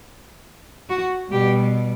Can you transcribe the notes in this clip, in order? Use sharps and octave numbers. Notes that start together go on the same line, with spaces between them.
F#4
B2 G3 G4